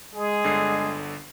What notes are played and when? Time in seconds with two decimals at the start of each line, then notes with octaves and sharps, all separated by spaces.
0.14 G#3 G#4
0.44 G1 D3 C7